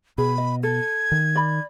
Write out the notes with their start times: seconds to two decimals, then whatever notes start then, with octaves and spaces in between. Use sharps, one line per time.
0.18 B2 G#4 B5
0.38 D#5
0.63 A4 G#6
1.12 D#3
1.35 D5 B5